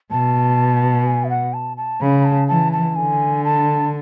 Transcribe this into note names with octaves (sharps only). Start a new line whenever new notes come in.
B2 A5
G#5
E5
F#5
A5
A5
C#3 B5
A5
E3 A5
A5
D3 G#5
A5